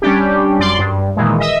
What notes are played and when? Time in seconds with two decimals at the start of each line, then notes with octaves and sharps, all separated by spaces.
0.02 G3 C#4 D4 G4
0.59 F#2 D5 C6
0.79 G2
1.17 A#2 D#3 E3 G#3
1.40 D#5 E5